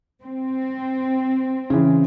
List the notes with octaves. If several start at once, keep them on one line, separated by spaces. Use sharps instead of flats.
C4
C#3 E3